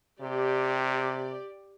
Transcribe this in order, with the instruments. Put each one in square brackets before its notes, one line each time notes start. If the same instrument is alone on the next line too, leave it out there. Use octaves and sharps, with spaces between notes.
[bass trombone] C3 [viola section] G4 D5